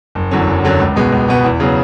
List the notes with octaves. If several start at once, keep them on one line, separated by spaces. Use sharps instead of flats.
F#1
E2 D3 F#3 C#4
F#1
E2 D3 F#3 C#4
C#2
B2 G#3 B3
C#2
B2 G#3 B3
E2
C#3 F#3 B3